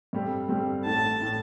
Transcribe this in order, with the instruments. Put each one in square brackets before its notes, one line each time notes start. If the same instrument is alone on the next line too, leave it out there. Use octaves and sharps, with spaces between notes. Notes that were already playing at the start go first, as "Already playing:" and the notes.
[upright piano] G2 G3 C4 A4
G2 G3 C4 A4
[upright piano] A1 A2 A3 [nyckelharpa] A5
[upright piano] A2 A3